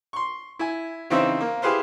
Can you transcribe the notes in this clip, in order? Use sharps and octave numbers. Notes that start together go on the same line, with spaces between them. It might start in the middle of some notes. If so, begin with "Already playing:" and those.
C6 C#6
E4 G#5
C#3 E3 C4 D#4 C5 E5
A#3
E4 G4 G#4 B4 C5 F5